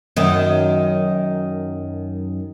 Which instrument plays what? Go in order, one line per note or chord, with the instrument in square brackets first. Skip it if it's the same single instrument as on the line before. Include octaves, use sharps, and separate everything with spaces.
[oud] F#2 D#3